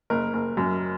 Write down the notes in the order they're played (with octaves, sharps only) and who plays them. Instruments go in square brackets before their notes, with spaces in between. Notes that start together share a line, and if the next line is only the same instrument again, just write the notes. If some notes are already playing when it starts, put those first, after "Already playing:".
[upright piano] F#1 A#4
F#1
F#2